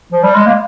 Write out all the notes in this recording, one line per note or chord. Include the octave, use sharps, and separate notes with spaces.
F3
G3
G#3
A#3